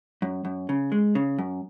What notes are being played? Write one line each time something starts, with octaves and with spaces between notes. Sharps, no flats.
F#2
F#2
C#3
G#3
C#3
F#2